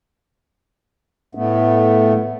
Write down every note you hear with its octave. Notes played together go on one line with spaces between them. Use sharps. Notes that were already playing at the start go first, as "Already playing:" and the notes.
A2 A3 B3